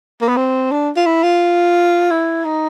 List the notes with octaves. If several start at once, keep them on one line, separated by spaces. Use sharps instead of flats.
A#3
B3
C4
D4
F4
E4
F4
E4
D#4